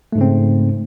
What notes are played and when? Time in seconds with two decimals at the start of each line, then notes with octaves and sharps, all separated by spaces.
0.12 A3
0.15 G#2
0.18 C#3
0.21 C4